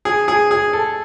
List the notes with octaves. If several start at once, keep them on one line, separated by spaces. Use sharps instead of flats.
G#4
G#4
G#4
A4